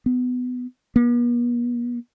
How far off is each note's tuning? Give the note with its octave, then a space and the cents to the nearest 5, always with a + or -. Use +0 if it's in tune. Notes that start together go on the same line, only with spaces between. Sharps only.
B3 +20
B3 -45